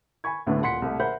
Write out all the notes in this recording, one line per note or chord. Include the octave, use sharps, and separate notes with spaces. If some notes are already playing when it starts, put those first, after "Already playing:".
G#5 B5 C#6 G#6
D2 A2 D3 A3 B3
D#1 A#2 F#5 C6 B6 C#7
C2 A3
A#4 C5 E5 F#5 B5 G6